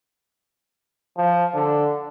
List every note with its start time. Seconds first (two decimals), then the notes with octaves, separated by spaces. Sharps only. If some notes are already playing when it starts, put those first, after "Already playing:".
1.17 F3
1.55 D3